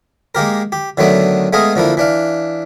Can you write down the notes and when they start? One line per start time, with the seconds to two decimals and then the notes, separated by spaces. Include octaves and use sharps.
0.35 G#3 A#3 G4 A#4
0.72 G4
0.97 D3 D#3 F#3 A3 B3 D4
1.53 G#3 A3 B3 G#4 D#5 F5
1.76 D3 F3 A#3 E4
1.97 E3 D4 F5